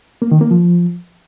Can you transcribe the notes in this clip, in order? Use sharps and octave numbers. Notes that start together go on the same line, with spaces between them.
A#3
D#3
A#3
F3